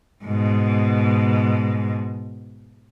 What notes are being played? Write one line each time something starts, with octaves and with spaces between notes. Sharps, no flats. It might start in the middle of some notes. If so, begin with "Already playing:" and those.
G#2 B2